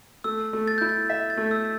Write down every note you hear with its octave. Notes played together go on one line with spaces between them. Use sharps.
A3 E6
A3
A6
E4 G6
A6
E5 B6
A6
A3
E6